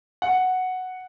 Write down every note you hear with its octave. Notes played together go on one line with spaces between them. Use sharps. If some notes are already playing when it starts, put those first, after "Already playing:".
F#5